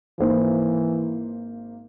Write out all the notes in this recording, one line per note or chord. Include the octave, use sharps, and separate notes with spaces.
G#1 E3 A#3 C5